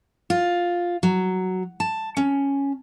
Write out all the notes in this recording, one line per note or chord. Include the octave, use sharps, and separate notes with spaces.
F4
F#3
A5
C#4